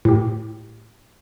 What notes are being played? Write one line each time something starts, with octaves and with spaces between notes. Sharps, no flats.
A2 G4